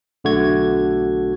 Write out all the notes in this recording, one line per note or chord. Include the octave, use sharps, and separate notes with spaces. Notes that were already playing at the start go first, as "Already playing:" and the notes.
B1 D3 A3 F#4 G#6